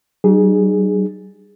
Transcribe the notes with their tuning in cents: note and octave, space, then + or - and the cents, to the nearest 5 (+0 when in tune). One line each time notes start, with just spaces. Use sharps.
G3 -45 D#4 -40 G#4 +0